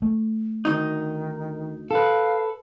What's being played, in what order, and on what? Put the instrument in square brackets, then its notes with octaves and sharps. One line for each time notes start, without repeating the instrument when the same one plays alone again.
[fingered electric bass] A3
[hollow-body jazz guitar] D2 D#4 [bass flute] D#3
[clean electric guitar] A4 B4 [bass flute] F5